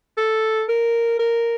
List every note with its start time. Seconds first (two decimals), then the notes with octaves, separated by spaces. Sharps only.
0.17 A4
0.69 A#4
1.19 A#4